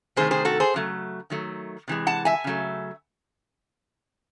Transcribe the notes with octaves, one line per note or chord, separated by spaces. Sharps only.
C3 D#3 A3 G#4 C5
G#4 C5
F#4 A4
G#4 C5
C#3 F#3 A3
D#3 F#3 A3
C3 E3 G#3
F#5 A5
E5 G#5
C#3 F#3 A3